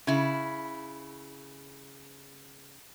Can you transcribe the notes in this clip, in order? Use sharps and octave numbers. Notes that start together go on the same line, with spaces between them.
C#3 E4